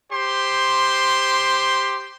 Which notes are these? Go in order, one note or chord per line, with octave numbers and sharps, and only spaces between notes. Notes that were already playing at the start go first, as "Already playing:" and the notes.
G4 C5 C6